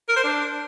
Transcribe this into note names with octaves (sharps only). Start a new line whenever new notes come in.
A#4
C5
D4